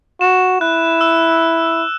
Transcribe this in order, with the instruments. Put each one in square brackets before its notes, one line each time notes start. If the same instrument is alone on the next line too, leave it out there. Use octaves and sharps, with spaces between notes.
[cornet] F#4 [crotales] E7
[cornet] E4 [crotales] F#6
[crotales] E6